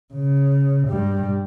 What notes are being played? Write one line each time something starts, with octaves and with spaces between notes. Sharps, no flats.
C#3
G2 G3